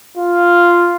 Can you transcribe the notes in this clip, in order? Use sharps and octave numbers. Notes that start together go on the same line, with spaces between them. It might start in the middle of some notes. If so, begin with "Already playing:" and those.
F4